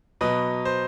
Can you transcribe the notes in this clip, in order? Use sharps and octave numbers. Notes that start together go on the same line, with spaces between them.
B2 F#3 B4 D#5
C5